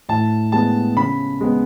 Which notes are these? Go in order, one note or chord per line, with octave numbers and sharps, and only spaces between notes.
A2 A5
G#3 B3 A5
C#3 B5
G#3 B3